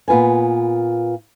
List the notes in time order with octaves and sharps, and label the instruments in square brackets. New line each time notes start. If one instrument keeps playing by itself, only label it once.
[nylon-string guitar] A#2 B3 F4 B4 G#5